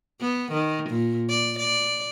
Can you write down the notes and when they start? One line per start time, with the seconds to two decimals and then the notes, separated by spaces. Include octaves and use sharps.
0.21 B3
0.52 D#3
0.90 A#2
1.30 D5
1.59 D5